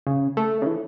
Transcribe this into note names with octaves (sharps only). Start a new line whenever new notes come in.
C#3
A3
C#3
E3